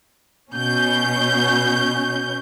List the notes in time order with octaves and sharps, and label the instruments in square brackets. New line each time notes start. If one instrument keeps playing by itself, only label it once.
[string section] B2 C#4 G6